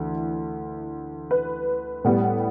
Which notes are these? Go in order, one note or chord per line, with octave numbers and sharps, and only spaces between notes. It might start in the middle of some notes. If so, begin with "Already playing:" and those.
Already playing: D2 E3
B4
A2 G3 B3